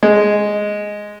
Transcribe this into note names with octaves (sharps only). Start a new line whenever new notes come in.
G#3